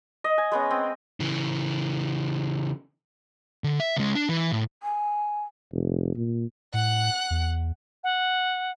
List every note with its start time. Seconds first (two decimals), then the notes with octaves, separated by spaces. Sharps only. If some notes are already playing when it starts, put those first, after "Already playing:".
0.24 D#5
0.38 G#5
0.52 G#3 B3 C#4
0.71 C4
1.20 C#3 E3
3.64 D3
3.80 E5
3.97 C#2 G#3
4.15 D4
4.29 E3
4.52 A2
4.83 G#5
5.72 F1
6.16 A#2
6.74 A2 F#5 F#6
7.30 E2
8.04 F#5